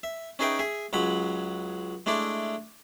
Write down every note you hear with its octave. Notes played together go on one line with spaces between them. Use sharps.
E5
C#4 D#4 G#4 B4 E5 G5
G#4 E5
C#2 F#3 G#3 F#5 B5
G#3 A3 D4 E4 D5